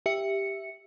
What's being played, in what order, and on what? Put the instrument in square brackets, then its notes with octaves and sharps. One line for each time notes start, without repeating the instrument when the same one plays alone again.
[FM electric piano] G4 E5 C#7